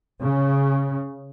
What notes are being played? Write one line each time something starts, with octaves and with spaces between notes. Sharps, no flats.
C#3